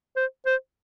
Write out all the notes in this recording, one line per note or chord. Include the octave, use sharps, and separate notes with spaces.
C5
C5